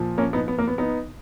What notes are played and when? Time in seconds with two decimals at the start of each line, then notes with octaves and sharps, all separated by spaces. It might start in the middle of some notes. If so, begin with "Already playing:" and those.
Already playing: A#2 F3
0.18 A#3 C#4
0.33 B3 D#4
0.48 B3
0.58 A#3
0.67 B3
0.78 B3 D#4